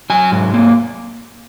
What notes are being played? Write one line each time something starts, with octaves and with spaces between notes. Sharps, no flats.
F#3 G#5
G#2
A#3